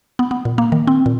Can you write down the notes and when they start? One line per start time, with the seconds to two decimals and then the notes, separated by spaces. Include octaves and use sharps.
0.19 B3
0.31 B3
0.45 A#2
0.58 A#3
0.72 D#3
0.87 C4
1.06 A#2